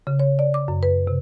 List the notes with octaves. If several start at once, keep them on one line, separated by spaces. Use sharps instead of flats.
C#3
C#5
D5
D6
F#2
B4
C3